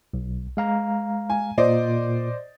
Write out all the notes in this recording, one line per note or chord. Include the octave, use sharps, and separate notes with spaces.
B1
G#3 F5 A#5
G#5
A#2 C5 D5 D#5